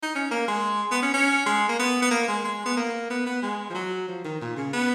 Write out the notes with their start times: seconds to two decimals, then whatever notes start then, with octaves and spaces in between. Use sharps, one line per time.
0.03 D#4
0.15 C#4
0.31 A#3
0.48 G#3
0.91 B3
1.02 C#4
1.14 C#4
1.46 G#3
1.69 A#3
1.79 B3
2.02 B3
2.11 A#3
2.28 G#3
2.44 G#3
2.65 B3
2.77 A#3
3.10 B3
3.26 B3
3.42 G#3
3.70 F3
3.75 F#3
4.08 F3
4.24 D#3
4.41 A#2
4.57 C#3
4.73 B3